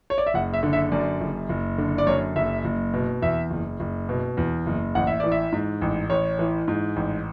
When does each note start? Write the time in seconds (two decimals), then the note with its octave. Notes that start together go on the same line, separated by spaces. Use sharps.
0.10 C#5
0.18 D5
0.27 E5
0.34 F#1 F#5
0.54 E5
0.63 D3
0.73 E5
0.92 F#2 D5
1.21 F#1
1.49 F#1
1.78 D3
1.98 D5
2.07 F#2 C#5
2.36 F#1 E5
2.65 F#1
2.94 B2
3.22 E2 E5
3.51 F#1
3.80 F#1
4.09 B2
4.37 E2
4.66 F#1
4.95 A1 F#5
5.07 E5
5.20 E3 D5
5.32 E5
5.52 G#2
5.81 A1
6.10 A1 C#5
6.39 E3
6.68 G#2
6.96 A1